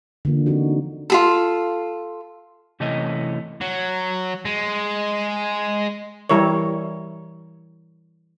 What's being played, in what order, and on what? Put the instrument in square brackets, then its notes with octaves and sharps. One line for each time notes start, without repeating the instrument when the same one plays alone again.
[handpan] D3 E3 A#3 F4
F3 C4 D#4 F#4
[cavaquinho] F4 G#4 A4
[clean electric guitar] C3 E3 A3 C#4 E4 D#5
[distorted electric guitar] F#3
G#3
[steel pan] E3 G3 E4 A#4 C#5